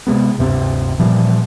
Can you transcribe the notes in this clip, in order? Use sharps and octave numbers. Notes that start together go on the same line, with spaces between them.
C3 D#3 G#3 B3
D1 G2 C3 C4
A#2 E3 F3 G3